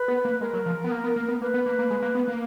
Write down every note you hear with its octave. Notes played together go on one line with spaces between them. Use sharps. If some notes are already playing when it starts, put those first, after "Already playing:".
Already playing: B4
B3
A#3
G#3 A#4
F#3
F3
B3
A#3
B3
A#3
B3
A#3 B4
B3
A#3
A#3
G#3
A#3
B3
A#3